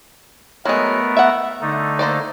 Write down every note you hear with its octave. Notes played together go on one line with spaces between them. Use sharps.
F#3 G#3 A3 B3 A#4
E5 F#5
D3 A3 D#4
A#3 C5 D5